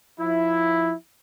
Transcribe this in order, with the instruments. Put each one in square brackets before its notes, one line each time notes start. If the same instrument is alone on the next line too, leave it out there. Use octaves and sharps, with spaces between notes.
[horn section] F3 E4